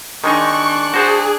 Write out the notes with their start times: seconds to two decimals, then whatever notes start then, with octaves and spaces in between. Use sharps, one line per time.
0.24 D#3 G#3 D4 D#4 C#6 F#6
0.94 F#4 G#4 C5 A5